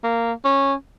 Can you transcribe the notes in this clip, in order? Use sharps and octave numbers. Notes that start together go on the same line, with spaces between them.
A#3
C#4